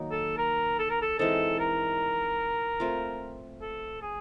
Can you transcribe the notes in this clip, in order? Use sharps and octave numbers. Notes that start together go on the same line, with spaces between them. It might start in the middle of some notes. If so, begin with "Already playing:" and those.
Already playing: D#3 F#3 A#3 D#4
A4
A#4
A4
A#4
A4
E3 G#3 C4 D#4 A4
A#4
A3 C4 F4
A4
G#4